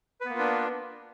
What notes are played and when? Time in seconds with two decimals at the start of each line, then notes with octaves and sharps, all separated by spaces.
0.21 B4
0.25 B3
0.30 A#3
0.34 F4
0.39 D4